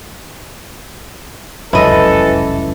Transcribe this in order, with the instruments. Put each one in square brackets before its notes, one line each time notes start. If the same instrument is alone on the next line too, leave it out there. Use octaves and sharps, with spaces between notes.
[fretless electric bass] F1 C#2 F#2 [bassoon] E3 [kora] E4 D#5 [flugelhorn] A4